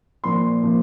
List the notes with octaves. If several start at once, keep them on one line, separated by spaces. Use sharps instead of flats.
A#2 F3 A#3 C6
A#2 F3 A#3